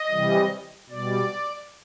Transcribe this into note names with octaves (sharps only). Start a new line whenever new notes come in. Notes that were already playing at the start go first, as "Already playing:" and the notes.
Already playing: D#5
C3 E3 G3
B2 G3 D5